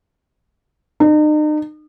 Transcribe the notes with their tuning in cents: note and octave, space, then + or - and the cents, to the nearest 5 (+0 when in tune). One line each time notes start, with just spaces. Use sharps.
D#4 -40